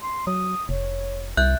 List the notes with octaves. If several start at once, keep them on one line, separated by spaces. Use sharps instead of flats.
C6
F#3 D#6
F1 C#5
C2 E5 F#6 G6